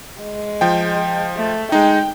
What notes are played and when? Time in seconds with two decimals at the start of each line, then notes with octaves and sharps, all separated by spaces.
0.22 G#3
0.61 F3 G5
1.36 A3
1.72 G#3 D#4 G5